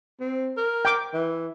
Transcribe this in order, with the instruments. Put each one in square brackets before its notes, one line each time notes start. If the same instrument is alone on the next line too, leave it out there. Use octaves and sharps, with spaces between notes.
[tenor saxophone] C4
A#4
[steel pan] G5 D6
[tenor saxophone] E3